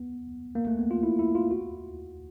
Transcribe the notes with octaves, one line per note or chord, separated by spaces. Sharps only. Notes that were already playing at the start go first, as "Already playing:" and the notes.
Already playing: B3
A#3
A3
B3
F4
E4
E4
F4
F#4